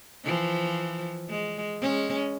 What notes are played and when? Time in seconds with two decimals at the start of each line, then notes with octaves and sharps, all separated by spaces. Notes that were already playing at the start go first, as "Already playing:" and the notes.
0.24 E3 F3
1.30 G#3
1.81 G#3 C#4